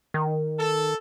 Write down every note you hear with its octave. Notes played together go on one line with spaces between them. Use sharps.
D#3
A4